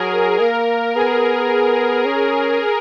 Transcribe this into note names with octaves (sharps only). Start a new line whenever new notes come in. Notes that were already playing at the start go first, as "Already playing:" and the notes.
Already playing: F#3 G#4 A#4
A#3 A#4
B3 G#4
C#4